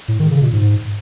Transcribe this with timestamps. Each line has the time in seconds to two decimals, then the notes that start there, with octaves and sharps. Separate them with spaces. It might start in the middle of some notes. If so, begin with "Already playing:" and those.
0.08 A2
0.19 D#3
0.30 C#3
0.41 A#2
0.52 G#2